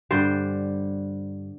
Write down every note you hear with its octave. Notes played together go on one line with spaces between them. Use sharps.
G2 D3 G3 C5